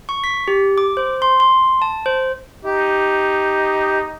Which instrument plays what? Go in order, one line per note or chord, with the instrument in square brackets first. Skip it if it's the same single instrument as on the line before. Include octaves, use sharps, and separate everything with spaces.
[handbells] C#6
B6
G4
D6
C5
C6
C6
A5
C5
[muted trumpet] D#4 [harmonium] G4